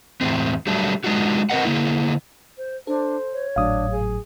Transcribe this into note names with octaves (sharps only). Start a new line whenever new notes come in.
E2 A2 C#3 C4
F#3 G3 A3 D4
G#3 D4 D#4 F4 F#4
C4 A#4 B4 D#5 F#5
D3 A#3 E4
C5
D4 A4 C5
C#5
G#1 A2 F#3 D4 F5 D#6
G#4